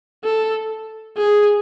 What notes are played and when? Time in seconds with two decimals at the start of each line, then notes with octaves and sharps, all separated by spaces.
0.24 A4
1.17 G#4